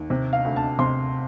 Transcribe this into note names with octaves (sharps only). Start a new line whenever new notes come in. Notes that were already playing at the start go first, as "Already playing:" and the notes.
Already playing: D#2
C3
F5
D2
A5
C3 C6